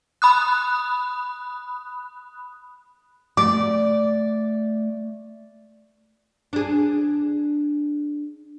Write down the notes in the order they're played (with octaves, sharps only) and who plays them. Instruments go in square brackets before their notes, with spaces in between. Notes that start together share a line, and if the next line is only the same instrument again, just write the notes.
[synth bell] B5 D#6 F#6
[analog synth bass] A3 [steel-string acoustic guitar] D5 [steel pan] D6
[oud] D4 G#4